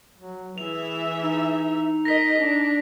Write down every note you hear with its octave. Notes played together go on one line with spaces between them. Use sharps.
F#3
E3 G#4 E5 F7
D#4
A#4 D#5 A#6 B6
D4 D#4